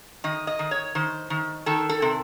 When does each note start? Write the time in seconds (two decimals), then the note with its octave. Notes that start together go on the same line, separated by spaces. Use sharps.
0.24 D#3 D#5
0.47 D#5
0.59 D#3
0.71 C#5
0.95 D#3 C5
1.30 D#3
1.66 D#3 A4
1.89 A4
2.02 C3